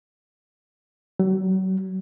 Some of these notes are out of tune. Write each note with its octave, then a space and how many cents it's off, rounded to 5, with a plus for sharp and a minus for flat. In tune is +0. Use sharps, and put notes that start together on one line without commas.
F#3 +35